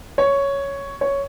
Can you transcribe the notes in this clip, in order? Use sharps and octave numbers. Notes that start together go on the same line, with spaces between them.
C#5
C#5